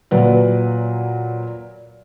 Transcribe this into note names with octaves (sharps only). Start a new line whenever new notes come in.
A#2 F#3 B4 D5